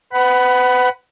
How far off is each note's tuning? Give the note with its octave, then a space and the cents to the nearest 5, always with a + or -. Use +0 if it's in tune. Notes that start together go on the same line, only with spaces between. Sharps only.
B4 +35 F#5 +20 B5 +0